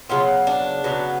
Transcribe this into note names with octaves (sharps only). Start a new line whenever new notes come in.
C#3 F#3 B3 F4
D4
C#3 F#3 B3